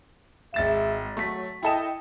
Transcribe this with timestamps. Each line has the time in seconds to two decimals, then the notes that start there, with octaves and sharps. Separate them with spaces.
0.54 G#1 G#3 E5 A6 E7
1.17 F#3 A3 B6
1.63 E4 A4 D#5 G5 E7